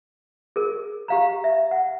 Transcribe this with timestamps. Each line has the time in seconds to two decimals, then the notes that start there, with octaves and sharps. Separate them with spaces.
0.56 G#4 A#4
1.08 G4 F5 A#5
1.44 E5
1.71 F#5